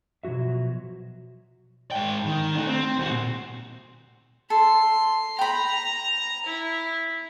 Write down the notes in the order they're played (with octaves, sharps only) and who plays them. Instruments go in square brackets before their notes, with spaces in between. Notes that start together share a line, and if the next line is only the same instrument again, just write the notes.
[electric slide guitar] B2 F3 F#3 F#4 E5
[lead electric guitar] G#2 G5
D#3
A3 D4
C4
D#2 F#4
A#2
[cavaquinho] A4 [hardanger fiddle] C6
[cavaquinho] G5 B5 [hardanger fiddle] A#5
[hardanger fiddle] E4